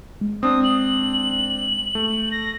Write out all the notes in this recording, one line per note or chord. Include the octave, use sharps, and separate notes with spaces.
G#3
C4 D4 D#6
F#7
A3
A#6